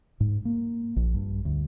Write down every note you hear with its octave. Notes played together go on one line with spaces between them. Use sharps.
G#2
A#3
A#1
G2
D2